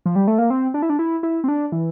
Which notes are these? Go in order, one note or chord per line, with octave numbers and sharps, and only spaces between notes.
F3
G3
A3
A#3
C4
D4
E4
D4
E4
E4
C4
D4
E3